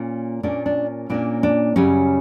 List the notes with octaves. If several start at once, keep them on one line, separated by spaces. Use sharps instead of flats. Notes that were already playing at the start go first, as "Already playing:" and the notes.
Already playing: A#2 A#3 C#4
A#2 A#3 C#4 D4
D4
A#2 A#3 C#4 D4
D4
F#2 C#3 G3 C#4